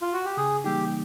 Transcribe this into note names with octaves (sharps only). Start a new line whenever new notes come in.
F4
F#4
G4
C#3 G#4
E3 G3 A#3 D#4 G4